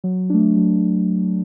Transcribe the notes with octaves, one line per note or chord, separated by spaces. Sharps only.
F#3
A3 D4
F#3